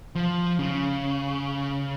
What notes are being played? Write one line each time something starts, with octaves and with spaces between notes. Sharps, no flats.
F3
C#3